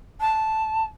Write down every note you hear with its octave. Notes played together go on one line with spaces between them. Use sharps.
A5